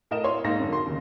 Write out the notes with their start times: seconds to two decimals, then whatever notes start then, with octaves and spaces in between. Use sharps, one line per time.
0.11 A2 A#4 D#5 E7
0.24 E4 C#5 C6
0.44 G#2 A#3 D#4 A#6
0.60 F#2 D3
0.73 C6
0.86 D#2 C#3